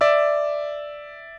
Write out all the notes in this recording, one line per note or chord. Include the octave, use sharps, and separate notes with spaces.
D5 E5 E6